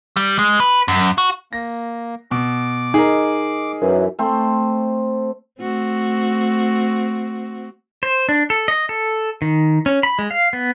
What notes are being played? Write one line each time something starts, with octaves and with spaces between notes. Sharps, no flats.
G3
G#3
B4
F#2
F#4
A#3 A#6
B2 D6
D#4 G#4 A#4
F#2 E3
A3 C4 C5
A3 C4 F#4
C5
D4
A4
D#5
A4
D#3
C#4
B5
G#3
F5
B3